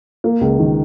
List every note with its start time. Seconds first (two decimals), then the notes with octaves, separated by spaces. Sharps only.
0.24 A#3
0.41 C#2
0.59 D#3